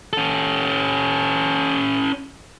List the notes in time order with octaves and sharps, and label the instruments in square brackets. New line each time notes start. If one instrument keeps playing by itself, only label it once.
[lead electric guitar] C#4 A4